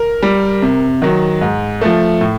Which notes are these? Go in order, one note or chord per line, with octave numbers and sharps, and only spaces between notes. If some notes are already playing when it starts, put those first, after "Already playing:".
Already playing: A#4
G3
C3
D#3 F#3
G#2
F3 A3
A2